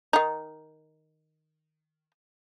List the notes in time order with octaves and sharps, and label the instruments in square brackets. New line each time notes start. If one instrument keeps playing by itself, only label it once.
[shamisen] D#3 D#4